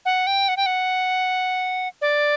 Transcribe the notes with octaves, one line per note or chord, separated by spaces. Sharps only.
F#5
G5
F#5
G5
F#5
D5